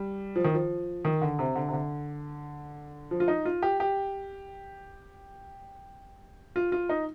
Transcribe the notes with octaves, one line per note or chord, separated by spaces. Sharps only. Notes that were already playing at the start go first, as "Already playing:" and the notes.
Already playing: G3
F3
D#3
F3
D#3
D3
C3
D3
C3
D3
F3
F4
D#4
F4
G4
G4
F4
F4
D#4